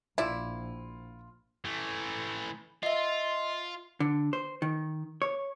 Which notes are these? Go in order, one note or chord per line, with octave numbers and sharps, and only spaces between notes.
A#1 E4 F4 D5 E5
E3 A3
F4 D#5 E5
D3
C5
D#3
C#5